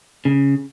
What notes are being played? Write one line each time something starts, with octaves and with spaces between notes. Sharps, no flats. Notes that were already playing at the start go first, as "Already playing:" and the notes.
C#3